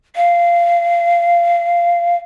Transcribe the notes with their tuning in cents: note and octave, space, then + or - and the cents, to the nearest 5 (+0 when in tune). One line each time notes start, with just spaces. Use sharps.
F5 -20